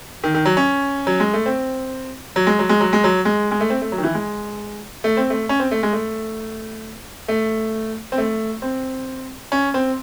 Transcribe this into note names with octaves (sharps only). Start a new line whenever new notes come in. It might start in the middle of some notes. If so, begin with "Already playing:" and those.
D#3
D#3
F#3
C#4
F#3
G#3
A3
C4
F#3
G#3
F#3
G#3
F#3
G#3
F#3
G#3
G#3
A3
C4
A3
F#3
D#3
E3
G#3
A3
C4
A3
C#4
C4
A3
G#3
A3
A3
C4
A3
C4
C#4
C4